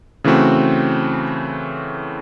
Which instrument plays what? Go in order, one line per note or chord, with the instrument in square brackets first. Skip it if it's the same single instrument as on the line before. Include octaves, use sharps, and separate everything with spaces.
[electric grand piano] C#3 E3 A3 C4 F#4